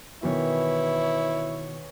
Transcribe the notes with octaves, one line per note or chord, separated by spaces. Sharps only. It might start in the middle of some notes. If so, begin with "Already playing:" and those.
B2 D#3 E3 E4 C#5